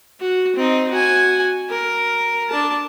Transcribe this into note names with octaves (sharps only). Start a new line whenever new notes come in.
F#4
C4 D#4
F#4 G#5
A#4
D4 A5